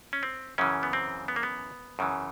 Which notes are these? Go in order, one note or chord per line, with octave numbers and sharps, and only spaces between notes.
C#4
C4
F#2 C#3 E3 C#4
B3
C4
B3
A#3
B3
F#2 C#3 E3